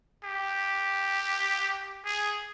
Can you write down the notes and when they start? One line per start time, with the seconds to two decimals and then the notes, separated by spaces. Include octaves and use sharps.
0.24 G4
2.05 G#4